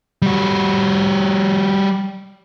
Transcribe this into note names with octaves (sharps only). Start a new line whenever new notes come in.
G3 F#4